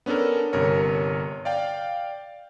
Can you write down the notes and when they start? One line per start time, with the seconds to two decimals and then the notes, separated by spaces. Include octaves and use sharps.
0.06 B3 C#4 D4 A4 A#4
0.53 G1 C3 A#4 C#5
1.45 D5 F5 G5